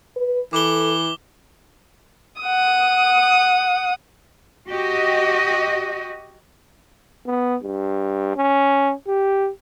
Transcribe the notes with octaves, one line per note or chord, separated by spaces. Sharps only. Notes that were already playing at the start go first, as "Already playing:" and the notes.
B4
E3 A4 D6 G7
F#5 D#6
F#4 G4 D#5
B3
G2
C#4
G4